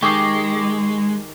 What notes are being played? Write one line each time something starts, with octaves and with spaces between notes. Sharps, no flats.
D#3 G#3 G4 G#4 C#6 D6 C7